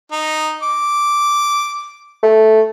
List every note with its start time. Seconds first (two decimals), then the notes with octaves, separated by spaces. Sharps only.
0.12 D#4
0.62 D6
2.23 A3